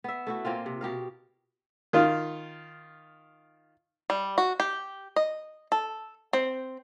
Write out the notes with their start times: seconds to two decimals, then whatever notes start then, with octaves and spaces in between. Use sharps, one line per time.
0.04 B3 E5
0.27 A3 E4 F#4
0.45 A#2 A#3 C4 F4
0.66 C3
0.81 B2 G4 A#4 F5
1.93 D#3 F4
4.10 G3
4.38 F#4
4.60 G4
5.16 D#5
5.72 A4
6.33 C4